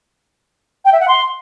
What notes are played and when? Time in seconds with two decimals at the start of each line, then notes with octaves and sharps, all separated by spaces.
0.85 G5
0.93 E5
1.00 F#5
1.08 C6